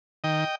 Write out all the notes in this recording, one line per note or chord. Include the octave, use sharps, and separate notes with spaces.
D#3 D#5 G5